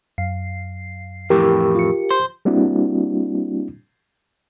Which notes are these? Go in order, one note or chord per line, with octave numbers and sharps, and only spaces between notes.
F#2 F5 C7
F2 A2 E3 G4 A#4 G5 D6
F4 C#7
C5
G3 A#3 C4 D4 E4 F#4